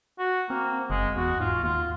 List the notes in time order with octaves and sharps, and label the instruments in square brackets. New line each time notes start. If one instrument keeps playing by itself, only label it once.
[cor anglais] F#4
[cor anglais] A#3 [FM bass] C4
[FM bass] F#1 [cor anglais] G#3
[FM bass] E2 [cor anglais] F#4
[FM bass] G#2 [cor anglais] F4
[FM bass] D#2 [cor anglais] F4